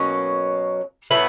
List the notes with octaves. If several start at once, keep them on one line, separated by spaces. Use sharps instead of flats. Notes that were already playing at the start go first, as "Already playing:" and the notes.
Already playing: B2 F#3 A#3 C#4
A2 F#3 B3 E4